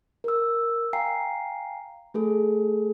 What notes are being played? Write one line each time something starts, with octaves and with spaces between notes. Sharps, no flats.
A#4 E6
F5 G5 G#5 A#5 C7
A3 G#4 A4